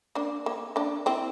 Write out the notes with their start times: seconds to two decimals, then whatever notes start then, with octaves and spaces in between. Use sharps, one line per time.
0.15 A#3 D4
0.46 A#3
0.76 A#3 D4
1.06 C4 E4